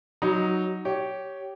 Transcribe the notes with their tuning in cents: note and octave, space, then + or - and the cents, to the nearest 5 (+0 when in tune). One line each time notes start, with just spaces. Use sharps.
F#3 +0 D#4 +0
G4 -15 C#5 +0